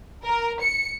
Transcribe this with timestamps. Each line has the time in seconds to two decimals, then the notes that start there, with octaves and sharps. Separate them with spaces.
0.25 A#4
0.62 C#7